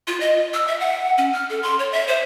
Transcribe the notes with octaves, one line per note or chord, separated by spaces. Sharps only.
F4
D#5
E6
E5
F#5
C#4
F6
A4
C6
C#5
E5
C5